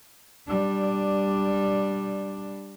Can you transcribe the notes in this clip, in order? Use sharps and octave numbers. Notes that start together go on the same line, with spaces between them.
G3 D4